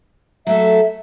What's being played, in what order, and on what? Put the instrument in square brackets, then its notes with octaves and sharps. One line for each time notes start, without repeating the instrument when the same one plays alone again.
[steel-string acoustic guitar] F#3 A3 A4 [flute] E5